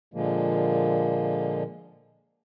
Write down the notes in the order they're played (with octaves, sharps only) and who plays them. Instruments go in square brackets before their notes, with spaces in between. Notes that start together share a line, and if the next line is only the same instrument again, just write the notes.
[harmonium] A#2 D3 F3 G#3 A#3